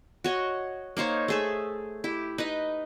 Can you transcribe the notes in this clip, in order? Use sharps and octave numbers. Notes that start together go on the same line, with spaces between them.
F#4 C#5 D#5
A#3 D#4 C5 C#5
A3 G#4 E5
E4 G4
D#4 B4 D#5